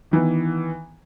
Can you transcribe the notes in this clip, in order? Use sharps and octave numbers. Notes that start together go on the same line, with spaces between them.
D#3 E3 B3